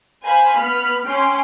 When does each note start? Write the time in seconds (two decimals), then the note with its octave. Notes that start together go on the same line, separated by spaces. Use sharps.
0.24 C5 F5 G#5 B5
0.58 B3 B5 F6
1.05 C#4 G5 C6